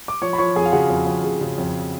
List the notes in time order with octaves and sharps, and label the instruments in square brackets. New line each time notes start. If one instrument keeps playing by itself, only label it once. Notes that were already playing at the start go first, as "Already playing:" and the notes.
[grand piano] D6
F3 C#5 C#6
B5
F3 C#5 C#6
F2 G#4 G#5
F5
C#3 F#4 F#5
F2
F2
C#3
C#3
F2